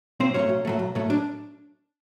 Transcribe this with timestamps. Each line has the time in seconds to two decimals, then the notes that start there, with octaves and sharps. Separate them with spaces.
0.20 B1 C4 C5
0.34 A2 F#3 A3 C#4 C#5
0.49 B1
0.65 A2 F#3 A3
0.79 B1
0.95 A2 F#3 A3
1.10 D4